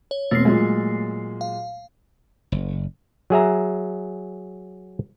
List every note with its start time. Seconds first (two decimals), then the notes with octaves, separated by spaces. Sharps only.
0.11 C#5
0.31 E1 A3 A#3 C4 C7
0.45 A#2 F#3 G#3
1.41 F5
2.52 F#1
3.30 F#3 G#4 E5 A#5